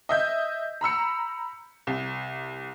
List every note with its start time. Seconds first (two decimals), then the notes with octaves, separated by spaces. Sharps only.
0.09 D#5 E5 G6
0.81 A#5 B5 E6 C#7
1.87 C2